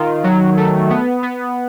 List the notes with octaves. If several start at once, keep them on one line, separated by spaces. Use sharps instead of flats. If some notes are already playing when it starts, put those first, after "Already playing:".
Already playing: D#3 F4
F#3
A3
B3
B3